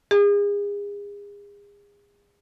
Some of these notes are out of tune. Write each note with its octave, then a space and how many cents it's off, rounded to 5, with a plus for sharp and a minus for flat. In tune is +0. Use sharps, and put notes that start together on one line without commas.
G#4 -35